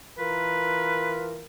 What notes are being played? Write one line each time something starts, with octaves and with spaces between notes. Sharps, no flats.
E3 F4 A#4 B4